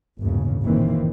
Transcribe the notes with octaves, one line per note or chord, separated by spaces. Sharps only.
G1 D#2 A2 C#3
F#1 A#2 D#3 E3 A#3 C4